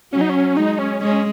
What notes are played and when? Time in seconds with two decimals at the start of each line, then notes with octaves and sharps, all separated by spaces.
0.12 F#3 C#4
0.21 D#4
0.30 C#4
0.57 G#3 D#4
0.79 C#4
1.00 G#3 C#4